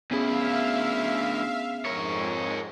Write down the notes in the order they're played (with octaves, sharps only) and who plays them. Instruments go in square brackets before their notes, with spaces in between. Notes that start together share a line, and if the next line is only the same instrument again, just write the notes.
[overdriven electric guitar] D2 E4 [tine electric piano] B3 C#4 G#4 [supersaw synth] E5 F5
[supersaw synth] F2 G#2 [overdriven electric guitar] A#4 C#5